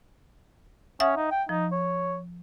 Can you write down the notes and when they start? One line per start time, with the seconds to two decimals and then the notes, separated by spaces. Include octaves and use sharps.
1.00 C#4 E5 F#5 D#6
1.16 D#4
1.31 G5
1.49 F3 D#4
1.72 C#5